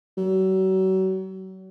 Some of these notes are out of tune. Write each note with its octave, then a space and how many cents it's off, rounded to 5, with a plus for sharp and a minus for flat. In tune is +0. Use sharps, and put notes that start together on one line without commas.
F#3 +35